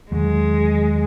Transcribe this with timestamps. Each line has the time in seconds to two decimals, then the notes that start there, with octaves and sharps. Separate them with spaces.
0.11 E2 D#3 F#3 G#3